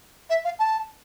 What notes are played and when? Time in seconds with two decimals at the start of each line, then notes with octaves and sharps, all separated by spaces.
0.30 E5
0.45 F5
0.59 A5